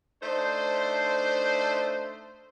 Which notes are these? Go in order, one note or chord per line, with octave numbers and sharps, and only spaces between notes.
A3 D4 D#4 C5